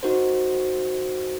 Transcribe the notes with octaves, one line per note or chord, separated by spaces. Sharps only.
D#4 F#4 A#4 C5